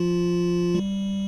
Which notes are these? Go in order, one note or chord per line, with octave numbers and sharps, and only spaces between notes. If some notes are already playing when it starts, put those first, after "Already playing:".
Already playing: F3 F4
G3